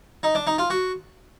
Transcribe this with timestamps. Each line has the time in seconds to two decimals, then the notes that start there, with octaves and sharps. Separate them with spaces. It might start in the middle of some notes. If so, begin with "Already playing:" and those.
0.23 D#4
0.35 D4
0.47 D#4
0.58 F4
0.70 F#4